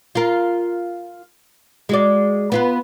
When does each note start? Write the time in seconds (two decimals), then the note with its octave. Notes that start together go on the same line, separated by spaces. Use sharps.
0.15 F4 A#4
1.89 G#3 F#4 D5
2.52 B3 F4 B4